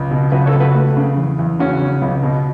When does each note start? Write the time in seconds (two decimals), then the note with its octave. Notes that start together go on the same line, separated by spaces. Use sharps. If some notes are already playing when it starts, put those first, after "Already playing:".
Already playing: C#2
0.11 B2
0.32 C#2 F#4 B4
0.46 A4 C#5
0.54 C#2
0.60 F#4 B4
0.75 A3
0.97 C#3
1.17 E2
1.39 E2
1.59 C#3 C#4 F#4
1.82 C#3
2.02 C#2
2.23 B2